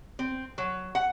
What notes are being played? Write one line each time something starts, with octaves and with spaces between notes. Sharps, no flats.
C4
F#3
F#5